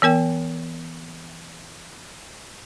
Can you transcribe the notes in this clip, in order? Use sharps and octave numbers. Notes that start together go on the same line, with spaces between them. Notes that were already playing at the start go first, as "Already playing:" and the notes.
E3 B3 A#4 G5